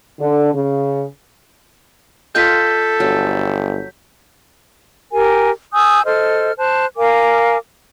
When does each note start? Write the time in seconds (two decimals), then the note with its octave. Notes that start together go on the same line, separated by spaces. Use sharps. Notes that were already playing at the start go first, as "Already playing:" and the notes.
0.20 D3
0.53 C#3
2.35 F4 A4 D#5 G5 G6 B6
3.00 G1 F#3
5.11 G4 A#4 G#5
5.73 G#5 D#6 E6 G6
6.05 A4 C5 D#5 F6
6.58 C5 A5 F#6
6.96 A#4 F5 G#5 D6